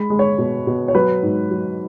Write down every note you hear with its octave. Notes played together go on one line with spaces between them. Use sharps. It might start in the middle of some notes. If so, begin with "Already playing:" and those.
Already playing: G#3 B5
G#3
C#5
B2
B2
C#5
F#3 B4
G#2
F#3